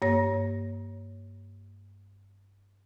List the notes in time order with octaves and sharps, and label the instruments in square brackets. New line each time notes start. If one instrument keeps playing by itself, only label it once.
[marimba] G2 A#3 C#5 A#6